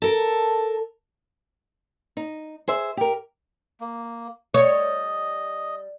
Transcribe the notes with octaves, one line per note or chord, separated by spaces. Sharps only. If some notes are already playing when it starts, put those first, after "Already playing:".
A4 A#4
D#4
G#4 C5 E5
G4 A#4
A#3
G3 C#5 D#5